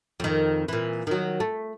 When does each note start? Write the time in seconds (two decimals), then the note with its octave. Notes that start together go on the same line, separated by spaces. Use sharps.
0.20 F2 D#3
0.68 A#2 E3
1.07 D#3 F#3
1.40 A3